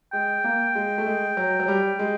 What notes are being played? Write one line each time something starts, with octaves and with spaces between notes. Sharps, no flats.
G#3 G5
A#3
G#3
A3
G#3
F#3
F#3
G3
G#3